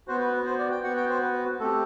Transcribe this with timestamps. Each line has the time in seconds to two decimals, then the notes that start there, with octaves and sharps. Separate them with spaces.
0.08 B3 F#4 C5
0.20 B4
0.33 B4
0.46 C5
0.59 D5
0.71 G5
0.84 B3 F#4 F#5
0.96 G5
1.09 C5
1.22 B4
1.59 A3 C4 G4 A4